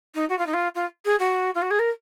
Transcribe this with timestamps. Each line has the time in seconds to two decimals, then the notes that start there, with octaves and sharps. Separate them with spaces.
0.15 D#4
0.29 F#4
0.38 F4
0.46 D#4
0.53 F4
0.75 F4
1.05 G#4
1.19 F#4
1.55 F4
1.62 F#4
1.70 G#4
1.79 A#4